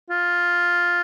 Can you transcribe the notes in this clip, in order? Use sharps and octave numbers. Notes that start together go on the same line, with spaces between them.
F4